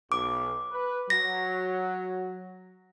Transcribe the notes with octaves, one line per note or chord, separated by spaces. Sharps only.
B1 D6
B4
F#3 A#6